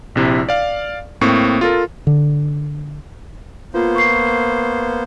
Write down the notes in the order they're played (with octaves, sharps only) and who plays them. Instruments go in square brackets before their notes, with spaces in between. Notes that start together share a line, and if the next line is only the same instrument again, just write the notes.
[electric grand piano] A#1 C3 E4
D5 F5
A2 A#3 C4 C#6
F4 A4 A#4
[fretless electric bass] D3
[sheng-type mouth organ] A#3 B3 C5 [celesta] F4
[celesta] C#6 C7